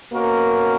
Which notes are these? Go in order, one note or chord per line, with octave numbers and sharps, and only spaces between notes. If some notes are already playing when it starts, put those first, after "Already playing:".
B2 A#3 C#4 F#4 A#4